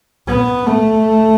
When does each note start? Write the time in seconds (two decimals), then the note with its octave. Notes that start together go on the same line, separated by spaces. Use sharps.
0.28 B3
0.67 A3